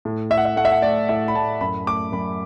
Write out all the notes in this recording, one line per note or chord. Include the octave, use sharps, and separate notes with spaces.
A2
A2 E5
F#5
E5
A3 F#5
E5
F#5
A3 D5
A2 E5
B5
A2 A5
F#2 B5
A3 D6
F#2 B5